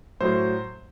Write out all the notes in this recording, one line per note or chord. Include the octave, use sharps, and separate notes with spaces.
A2 F#3 C5